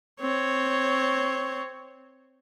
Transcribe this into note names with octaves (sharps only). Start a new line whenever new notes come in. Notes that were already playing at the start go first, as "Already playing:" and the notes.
C4 C#5